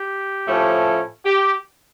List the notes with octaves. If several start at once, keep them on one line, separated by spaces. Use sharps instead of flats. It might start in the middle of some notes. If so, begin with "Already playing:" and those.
Already playing: G4
A2 F3 A3 C#4
G4